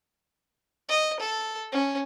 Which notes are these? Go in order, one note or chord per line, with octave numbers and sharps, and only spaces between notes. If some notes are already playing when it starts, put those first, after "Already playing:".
D#5
A4
C#4